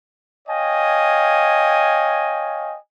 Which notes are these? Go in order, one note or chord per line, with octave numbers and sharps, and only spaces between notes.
C#5 D#5 F5 G5 G#5